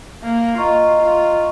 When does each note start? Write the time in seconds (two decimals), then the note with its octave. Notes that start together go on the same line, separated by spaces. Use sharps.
0.23 A#3
0.58 F4 D#5 A#5 C#6
1.02 F4